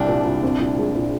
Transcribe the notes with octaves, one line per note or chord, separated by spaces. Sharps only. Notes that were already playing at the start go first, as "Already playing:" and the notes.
Already playing: C2 G3 D4
A#2
C2
C4
A#2
G#3
A#2